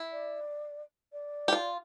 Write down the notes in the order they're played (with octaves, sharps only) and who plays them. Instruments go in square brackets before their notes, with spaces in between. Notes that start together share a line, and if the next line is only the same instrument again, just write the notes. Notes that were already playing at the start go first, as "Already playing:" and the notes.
Already playing: [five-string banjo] E4
[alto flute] D5
D5
[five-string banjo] G4
F4